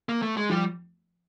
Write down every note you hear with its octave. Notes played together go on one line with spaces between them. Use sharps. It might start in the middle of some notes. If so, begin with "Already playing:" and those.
A#3
A3
G#3
F3 G3